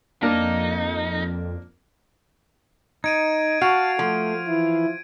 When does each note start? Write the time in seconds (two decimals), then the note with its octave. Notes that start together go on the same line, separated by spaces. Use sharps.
0.23 F2 A#3 D4 D#4
3.04 D#4 G#6 D7 D#7
3.61 F#4 F5 A5 D7
3.99 F3 A3
4.47 E3 E4